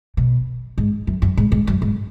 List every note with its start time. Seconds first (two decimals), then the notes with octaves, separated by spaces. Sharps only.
0.17 B2
0.78 G#2
1.07 F#2
1.22 F#2
1.37 G#2
1.52 G#2
1.67 F#2
1.82 G#2